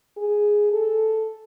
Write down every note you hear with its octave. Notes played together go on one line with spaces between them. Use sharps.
G#4
A4